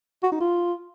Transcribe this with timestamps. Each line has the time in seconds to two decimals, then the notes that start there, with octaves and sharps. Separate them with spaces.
0.23 F#4
0.32 D#4
0.40 F4